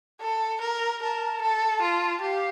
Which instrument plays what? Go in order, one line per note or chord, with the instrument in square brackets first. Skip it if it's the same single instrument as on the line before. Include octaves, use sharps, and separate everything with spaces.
[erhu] A4
A#4
[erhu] A#4 [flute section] A5
[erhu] A4
F4
[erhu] G4 [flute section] F5